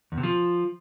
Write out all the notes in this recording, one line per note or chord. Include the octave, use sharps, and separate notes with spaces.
E2
C3
F3